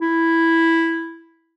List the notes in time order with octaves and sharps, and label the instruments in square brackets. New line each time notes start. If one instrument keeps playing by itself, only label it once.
[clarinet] E4